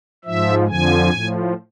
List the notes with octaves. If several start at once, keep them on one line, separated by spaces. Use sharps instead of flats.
G#2 F3 E5
F2 D3 F3 G#5
A2 F3